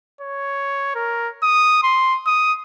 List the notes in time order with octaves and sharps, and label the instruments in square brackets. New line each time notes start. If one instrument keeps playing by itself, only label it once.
[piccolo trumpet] C#5
A#4
D#6
C6
D#6